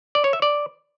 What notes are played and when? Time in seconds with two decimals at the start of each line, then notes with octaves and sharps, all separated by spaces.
0.15 D5
0.24 C#5
0.33 E5
0.42 D5